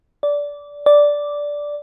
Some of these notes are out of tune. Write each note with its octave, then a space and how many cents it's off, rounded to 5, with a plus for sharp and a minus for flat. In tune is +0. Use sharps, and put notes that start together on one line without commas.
D5 -15
D5 -5